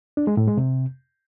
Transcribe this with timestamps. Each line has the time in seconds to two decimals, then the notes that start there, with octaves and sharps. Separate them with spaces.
0.17 D4
0.27 G#3
0.37 A2
0.47 G#3
0.57 C3